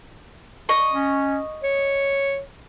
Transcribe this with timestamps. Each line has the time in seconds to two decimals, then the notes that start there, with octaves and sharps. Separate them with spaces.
0.69 D#5 C#6
0.92 C#4
1.63 C#5